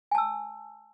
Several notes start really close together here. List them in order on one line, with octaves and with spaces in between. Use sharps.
G#5 A5 E6